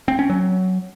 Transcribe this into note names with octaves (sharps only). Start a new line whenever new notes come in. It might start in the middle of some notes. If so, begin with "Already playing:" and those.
C4
C#4
F#3